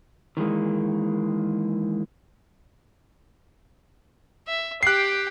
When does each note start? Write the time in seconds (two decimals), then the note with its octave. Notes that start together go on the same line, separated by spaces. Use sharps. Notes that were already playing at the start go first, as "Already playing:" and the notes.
0.37 D#3 E3 G#3 A#3
4.48 E5
4.83 G4 G5 F#6 C7